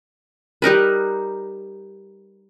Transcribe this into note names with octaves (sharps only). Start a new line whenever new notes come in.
G3 D#4 A#4 B4